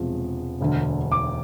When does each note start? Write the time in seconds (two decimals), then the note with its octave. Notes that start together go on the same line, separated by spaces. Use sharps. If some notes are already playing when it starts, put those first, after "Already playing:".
Already playing: E1 E2 C3 F3 G#3
0.61 E1 D2 D3
1.12 D6